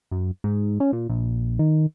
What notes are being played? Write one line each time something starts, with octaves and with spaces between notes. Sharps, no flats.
F#2
G#2
C#4
A#2
A#1
D#3